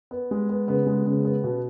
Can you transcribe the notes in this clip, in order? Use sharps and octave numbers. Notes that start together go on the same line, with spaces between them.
B3
G#3
B3
C#3 B3
G#3
C#3 B3
B3
B2